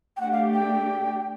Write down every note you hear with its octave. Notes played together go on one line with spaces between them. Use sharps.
G5
A3 D4 G4 F#5
F5
G5